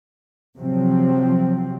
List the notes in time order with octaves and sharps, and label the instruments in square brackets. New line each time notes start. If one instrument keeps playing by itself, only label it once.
[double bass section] C3 F3 F#3 C4